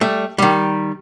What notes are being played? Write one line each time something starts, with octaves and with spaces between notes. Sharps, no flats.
G3 A3
D#3 G3